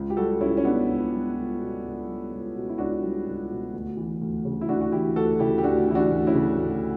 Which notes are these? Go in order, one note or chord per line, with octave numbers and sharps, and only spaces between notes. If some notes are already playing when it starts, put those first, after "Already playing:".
Already playing: C#2
G4
G3 F#4 A4
C#2 C#4 E4
C#4
B2 B3 D4
C#2
G3
C#2
B2
C#2
G3
C#2
B2
E4
C#2 D4 F#4
G3
C#2
B2
D2
E3
D2
C#3
E4
D2 D4 F#4
F#4
E3 E4 G4
D2 F#4 A4
C#3 E4 G4
G4
D2 D4 F#4
E3 E4
D4 F#4
D2
C#4 E4
C#3
D2